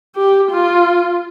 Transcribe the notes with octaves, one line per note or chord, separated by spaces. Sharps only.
G4
F4